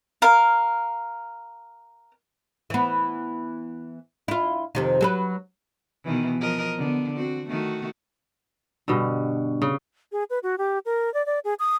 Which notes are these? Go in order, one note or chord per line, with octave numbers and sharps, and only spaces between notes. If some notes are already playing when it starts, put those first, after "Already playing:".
A#4 F5
E3 B3
E4 F4
F2 C3 D#3
F#3 A4 B4
B2 D#3 E3
F3 A#4 D#5
D3 B3
C4 F#4
D#3 A3 F#4
G2 B2 D3
C#3
G#4
B4
F#4
G4
A#4
D5
D5
G#4
D#6